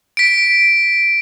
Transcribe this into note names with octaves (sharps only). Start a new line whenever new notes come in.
B6 D7